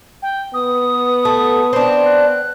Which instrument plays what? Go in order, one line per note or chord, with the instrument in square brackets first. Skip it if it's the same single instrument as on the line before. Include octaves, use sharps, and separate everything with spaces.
[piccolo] G5
[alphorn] B3 [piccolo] D#6
[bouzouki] A3
C4 D4
[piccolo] F#6